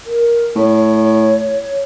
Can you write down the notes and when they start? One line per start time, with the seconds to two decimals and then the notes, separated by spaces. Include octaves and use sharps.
0.06 A#4
0.56 A2 C#5